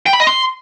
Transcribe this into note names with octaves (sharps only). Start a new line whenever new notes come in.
G5
B5
D#5
C6